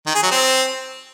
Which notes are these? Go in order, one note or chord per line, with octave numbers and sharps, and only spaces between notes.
D#3
G#4
F#3
C4